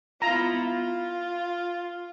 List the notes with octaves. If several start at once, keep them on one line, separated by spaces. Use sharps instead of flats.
B3 E4 F4 A#5
F4